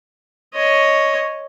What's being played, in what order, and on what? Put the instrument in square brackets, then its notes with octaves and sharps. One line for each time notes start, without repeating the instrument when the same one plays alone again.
[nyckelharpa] C#5 D#5